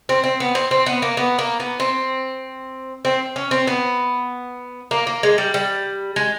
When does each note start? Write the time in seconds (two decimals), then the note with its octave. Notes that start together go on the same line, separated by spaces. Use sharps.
0.09 C4
0.24 C4
0.40 B3
0.55 C4
0.71 C4
0.86 B3
1.02 A#3
1.17 B3
1.39 A#3
1.60 B3
1.80 C4
3.05 C4
3.36 C#4
3.51 C4
3.67 B3
4.91 A#3
5.07 A#3
5.23 G#3
5.38 G3
5.54 G3
6.16 G#3